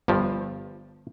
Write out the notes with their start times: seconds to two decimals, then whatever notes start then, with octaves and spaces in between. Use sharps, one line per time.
0.08 G1 G2 F3